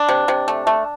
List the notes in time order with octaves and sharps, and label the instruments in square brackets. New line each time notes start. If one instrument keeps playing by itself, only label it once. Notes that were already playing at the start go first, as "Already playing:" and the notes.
Already playing: [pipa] D4
C3
C3
A3
A3